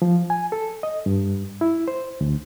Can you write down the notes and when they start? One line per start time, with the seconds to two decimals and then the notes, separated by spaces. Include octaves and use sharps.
0.02 F3
0.30 G#5
0.52 A4
0.83 D#5
1.06 G2
1.61 E4
1.88 C5
2.21 D2